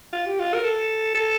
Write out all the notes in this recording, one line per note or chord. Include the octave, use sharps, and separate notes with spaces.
F4
G4
F4
A#4
A4
A4